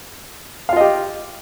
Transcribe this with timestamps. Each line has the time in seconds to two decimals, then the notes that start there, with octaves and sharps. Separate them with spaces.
0.69 F5
0.73 F4
0.77 D#5
0.80 G4